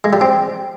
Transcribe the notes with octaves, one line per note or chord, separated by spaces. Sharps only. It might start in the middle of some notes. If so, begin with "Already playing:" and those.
G#3
G3
C4